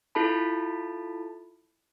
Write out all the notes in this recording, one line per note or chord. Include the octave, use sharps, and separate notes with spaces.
E4 F4 A4 A5 B5